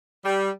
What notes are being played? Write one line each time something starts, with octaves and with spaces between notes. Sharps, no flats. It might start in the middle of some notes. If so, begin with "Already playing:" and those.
G3